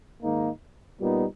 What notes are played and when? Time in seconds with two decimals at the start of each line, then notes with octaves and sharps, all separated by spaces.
0.23 G#2 D#3 A#3 D#4
0.99 A#2 G3 B3 D#4